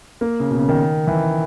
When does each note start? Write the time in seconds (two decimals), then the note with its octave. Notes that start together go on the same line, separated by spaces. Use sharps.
0.21 A#3
0.40 C#3
0.51 B2
0.59 C#3
0.69 D#3
1.07 E3